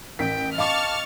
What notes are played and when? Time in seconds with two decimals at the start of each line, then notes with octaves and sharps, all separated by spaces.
0.19 A1 A#4 G5 B6
0.58 D#5 F5 A5 C#6 D6 F6 A6